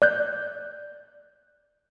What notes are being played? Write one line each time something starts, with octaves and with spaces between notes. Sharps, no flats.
D5 F#6 G6